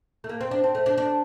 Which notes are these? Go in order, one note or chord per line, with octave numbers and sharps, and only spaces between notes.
A3
A#3
C4
D4
C4
A3
D4
D4